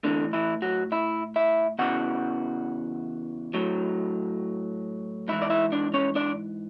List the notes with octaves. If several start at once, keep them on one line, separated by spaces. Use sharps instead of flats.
A2 D3 E3 D4
E3 E4
F#3 F#4
E4 E5
E4 E5
E2 C#3 E3 F#4 F#5
A2 F#3
G#2 E3 E4 E5
D5
E4 E5
D4 D5
C#4 C#5
D4 D5